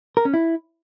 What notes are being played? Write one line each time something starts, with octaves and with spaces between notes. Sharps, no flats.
A#4
C#4
E4